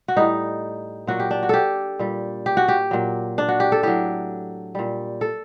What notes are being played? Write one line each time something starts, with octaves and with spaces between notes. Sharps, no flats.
F#4
A2 G3 D#4
A#2 F#3 F#4
G4
D4
F#4
G4 A4
A#2 G3
G4
F#4
G4
A#2 F#3
D4
F#4
G4
A4
A2 F#3 G4
A#2 G3
A4